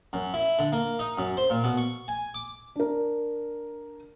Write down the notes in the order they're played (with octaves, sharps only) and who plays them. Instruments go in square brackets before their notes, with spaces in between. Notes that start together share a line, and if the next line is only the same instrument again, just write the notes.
[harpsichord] F#2
E4
D3
A#3
D#4
F#2
C5
A#2
B2
C#6
G#5
D6
[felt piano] D4 A#4